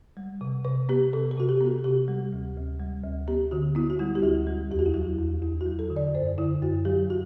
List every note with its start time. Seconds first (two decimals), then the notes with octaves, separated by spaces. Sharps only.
0.17 G3
0.41 C3
0.65 C3 B4
0.89 B3 G4
1.13 C3 A4
1.31 A4
1.37 C3 F#4
1.49 G4
1.61 B3
1.67 F#4
1.84 C3 G4
2.08 G3
2.33 D2
2.56 D2
2.79 G3
3.03 D2
3.28 B3 G4
3.51 D3 F#4
3.75 B3 E4
3.90 F#4
3.99 G3 E4
4.15 G4
4.23 D2 F#4
4.47 G3
4.71 E2 G4
4.79 F#4
4.86 E4
4.94 F#3 F#4
5.19 E2
5.42 E2 E4
5.61 F#4
5.66 F#3
5.79 A4
5.90 D3
5.96 D5
6.14 F#2 C5
6.38 D3 E4
6.62 F#2 F#4
6.85 F#3 G4
7.10 F#4